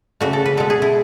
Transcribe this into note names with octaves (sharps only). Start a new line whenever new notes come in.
C#3 E3 A3 F#4
A4
B4
B2 G#3 A4
G#4
E4